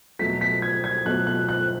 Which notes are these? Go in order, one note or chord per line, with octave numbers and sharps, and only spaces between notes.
B2 F#3 A3 B6
B6
G#6
G#6
B2 F#3 A3 F#6
F#6
F#6